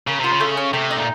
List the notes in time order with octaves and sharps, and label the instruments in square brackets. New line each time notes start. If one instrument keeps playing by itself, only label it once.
[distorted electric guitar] C#3 [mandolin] A#4
[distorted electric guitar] C3 [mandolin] F4
[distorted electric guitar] C#3
[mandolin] A3
C#4
[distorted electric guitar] C3 [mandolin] A3
[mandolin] D#4
[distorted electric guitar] A#2